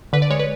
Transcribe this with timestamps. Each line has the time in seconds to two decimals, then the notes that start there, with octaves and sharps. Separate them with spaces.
0.13 D3 B4
0.22 D5
0.30 G#3 C#5
0.39 B4